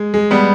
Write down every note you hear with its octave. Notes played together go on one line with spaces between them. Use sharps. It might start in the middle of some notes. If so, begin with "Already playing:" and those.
Already playing: G#3
G#3
G3 B3